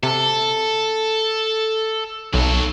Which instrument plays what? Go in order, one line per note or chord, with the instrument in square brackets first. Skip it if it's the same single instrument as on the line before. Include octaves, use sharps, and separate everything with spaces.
[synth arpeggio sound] C3 [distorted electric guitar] A4
[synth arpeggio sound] B1 [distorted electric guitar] F#3 A4